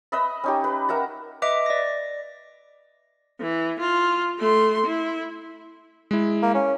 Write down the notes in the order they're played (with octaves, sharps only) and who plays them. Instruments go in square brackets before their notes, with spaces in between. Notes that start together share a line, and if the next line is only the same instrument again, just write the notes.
[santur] B4 D#5 E5 B5
C#4 D#4 G4
B4
A#4 E5 F#5 A#5
[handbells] B4 D#5 E5 D6
D5 A#6
[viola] E3
F4
A3 C6
E4
[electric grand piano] G#3 E4
[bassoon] A#3
C#4